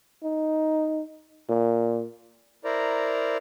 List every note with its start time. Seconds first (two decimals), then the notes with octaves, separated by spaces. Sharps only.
0.23 D#4
1.49 A#2
2.64 E4 A#4 C5 D5 A#5